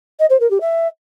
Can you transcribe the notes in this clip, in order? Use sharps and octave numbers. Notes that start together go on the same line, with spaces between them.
D#5
C5
A#4
G4
E5